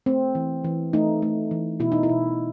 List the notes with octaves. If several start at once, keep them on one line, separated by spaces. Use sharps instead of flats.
A3 C4
E3
E3
A3 D#4
A3
E3
B2 E4
D#4
E4
B2